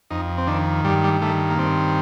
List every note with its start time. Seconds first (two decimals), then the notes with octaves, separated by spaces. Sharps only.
0.10 F2 D#4
0.38 C4
0.47 D#3 D4
0.84 G2 G3
1.04 G3
1.22 D#3 A3
1.50 A#3
1.58 G2 C4